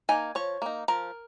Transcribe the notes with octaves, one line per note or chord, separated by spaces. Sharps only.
A#3 D#4 G#5
F3 C#5
A#3 D#4
F3 A#4